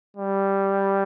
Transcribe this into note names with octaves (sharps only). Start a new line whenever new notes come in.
G3